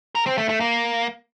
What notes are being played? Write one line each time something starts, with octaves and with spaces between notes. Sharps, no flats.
A#4
C4
A3
A3
A#3